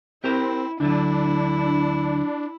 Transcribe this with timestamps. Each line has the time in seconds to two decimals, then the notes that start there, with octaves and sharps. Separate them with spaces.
0.24 C4 E4 G4 A#4 C5
0.80 D2 D3 F#3 D4 E4